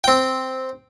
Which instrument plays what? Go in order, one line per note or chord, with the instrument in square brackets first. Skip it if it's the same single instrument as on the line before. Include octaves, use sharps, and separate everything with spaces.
[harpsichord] C4 G5